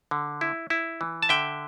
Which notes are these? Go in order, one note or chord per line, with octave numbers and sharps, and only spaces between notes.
D3
E4
E4
E3
A5
D3 E5 G5